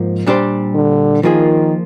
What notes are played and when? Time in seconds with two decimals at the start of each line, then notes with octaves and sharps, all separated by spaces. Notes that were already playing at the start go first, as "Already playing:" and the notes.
Already playing: G#2 F3 A#3
0.27 A#2 G3 D4 G4 C5
0.75 D3
1.23 D#3 F3 A#3 F4 G#4